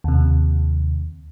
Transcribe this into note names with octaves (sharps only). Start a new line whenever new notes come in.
D#2 C3